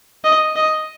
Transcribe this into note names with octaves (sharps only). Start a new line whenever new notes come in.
D#5
D#5